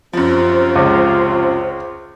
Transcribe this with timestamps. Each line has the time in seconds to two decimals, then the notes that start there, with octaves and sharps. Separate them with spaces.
0.13 F#2 C3 F3 F4 C5
0.75 C#2